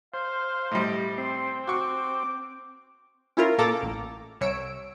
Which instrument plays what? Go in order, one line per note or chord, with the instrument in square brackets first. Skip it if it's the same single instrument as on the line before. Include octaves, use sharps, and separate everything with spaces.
[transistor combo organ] C5 [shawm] F5
[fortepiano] A2 C3 G3 [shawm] D#5
[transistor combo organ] C4 [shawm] C6
[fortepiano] F#4 C#6 [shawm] D6
[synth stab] C#4 E4 F4 A#4
A#2 A#3 A4 A#5 D6 A6
A1
C2 C#5 E6 D7